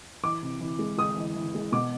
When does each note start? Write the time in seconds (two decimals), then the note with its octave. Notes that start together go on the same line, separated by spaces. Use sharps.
0.23 E3 D6
0.43 C3
0.61 E3
0.79 G#3
0.98 G#3 D#6
1.16 E3
1.36 E3
1.55 G#3
1.72 B2 D6